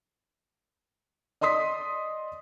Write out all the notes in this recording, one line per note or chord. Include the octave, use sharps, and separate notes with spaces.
D5 D#5 C6 D#6 B6